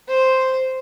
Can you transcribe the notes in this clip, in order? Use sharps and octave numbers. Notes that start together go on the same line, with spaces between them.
C5